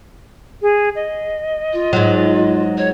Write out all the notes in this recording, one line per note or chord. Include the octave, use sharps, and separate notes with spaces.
G#4
D#5
F4
G#2 F#3
C#5